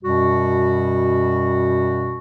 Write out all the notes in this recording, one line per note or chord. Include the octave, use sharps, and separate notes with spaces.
F#2 B2 G3 F#4